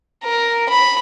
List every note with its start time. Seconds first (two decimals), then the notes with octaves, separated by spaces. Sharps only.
0.24 A#4
0.70 B5